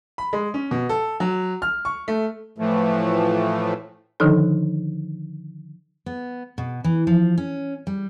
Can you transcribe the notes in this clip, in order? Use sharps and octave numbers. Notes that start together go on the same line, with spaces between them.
B5
G#3
C#4
B2
A4
F#3
F6
C#6
A3
A2 E3 F3 A3
D3 D#3 F3 D4 D#4 A4
B3
B2
E3
F3
C#4
G3